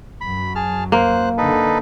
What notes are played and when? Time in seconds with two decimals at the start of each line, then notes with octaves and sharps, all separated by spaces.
0.21 F#2 F#3 B5
0.55 G#4 A5 F6
0.92 A#3 C5 F#6
1.38 D3 D#4 A4 B4